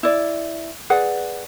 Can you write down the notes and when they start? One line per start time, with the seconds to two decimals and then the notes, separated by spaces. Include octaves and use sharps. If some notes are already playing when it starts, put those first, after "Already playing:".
0.03 E4 D5
0.90 G#4 B4 D5 F#5